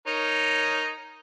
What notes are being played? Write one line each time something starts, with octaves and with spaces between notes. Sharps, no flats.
D#4 A#4 C#5